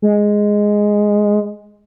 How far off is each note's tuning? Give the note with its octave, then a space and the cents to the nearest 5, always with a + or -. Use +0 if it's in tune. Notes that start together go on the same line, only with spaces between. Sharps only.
G#3 +0